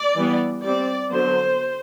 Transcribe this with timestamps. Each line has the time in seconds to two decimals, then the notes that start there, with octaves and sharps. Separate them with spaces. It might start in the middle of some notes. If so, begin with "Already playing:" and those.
Already playing: D5
0.16 E3 G3 B3
0.64 G3 C4 D5
1.11 D3 F#3 B3 C5